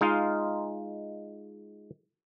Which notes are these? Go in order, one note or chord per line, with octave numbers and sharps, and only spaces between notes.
G#3 D#4 F4 F5